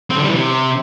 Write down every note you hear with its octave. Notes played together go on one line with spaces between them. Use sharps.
C4
D3
G3
E3
C3